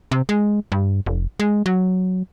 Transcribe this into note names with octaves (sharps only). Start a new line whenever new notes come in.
C3
G#3
G2
F1
G#3
F#3